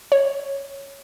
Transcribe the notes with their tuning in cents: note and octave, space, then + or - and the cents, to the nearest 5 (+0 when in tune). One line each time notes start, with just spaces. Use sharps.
C#5 -5